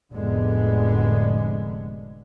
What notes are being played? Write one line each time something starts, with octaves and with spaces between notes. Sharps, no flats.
F1 A2 D3 G#3 B3